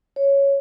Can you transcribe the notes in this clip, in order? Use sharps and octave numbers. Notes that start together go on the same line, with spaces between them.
C#5